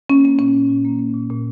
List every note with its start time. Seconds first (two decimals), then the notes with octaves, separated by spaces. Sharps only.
0.10 A#3 C#4
0.24 A#3 C#4
0.39 A#2 C#4
0.55 A#2
0.69 A#2
0.85 A#3
0.99 A#3
1.14 A#2
1.30 A#2